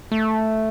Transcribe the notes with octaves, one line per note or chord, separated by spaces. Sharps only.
A3